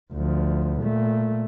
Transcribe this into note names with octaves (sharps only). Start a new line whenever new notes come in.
D2 F3
A#2 A3